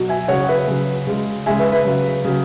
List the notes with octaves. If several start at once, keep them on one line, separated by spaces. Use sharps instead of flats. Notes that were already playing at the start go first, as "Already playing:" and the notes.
Already playing: B2 F#3
E5 G#5
C#3 F#3 C#5 F#5
F#5
B4 E5
C#3 F#3
C#3 G#3
C#3 G#3 E5 G#5
B4 E5
B4 E5
C#3 F#3
C#3 F#3